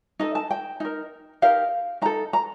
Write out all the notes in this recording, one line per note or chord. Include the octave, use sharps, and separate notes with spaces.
D#4 A4 D#5
A5
G5
D#4 A#4
D#4 G4 A#4 F5
D#4 A4 A#5
A#5